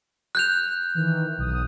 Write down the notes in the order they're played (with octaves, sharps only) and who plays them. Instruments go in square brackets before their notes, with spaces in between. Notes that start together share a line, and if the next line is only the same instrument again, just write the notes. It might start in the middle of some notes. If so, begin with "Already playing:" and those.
[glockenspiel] F#6 G6 F7
[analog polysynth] D#3 E3
B1 D#6